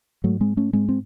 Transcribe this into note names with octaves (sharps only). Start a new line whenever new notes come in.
G#2 F#3 A3
G#3 C4
A3 C#4
G#2 G#3 C4
C4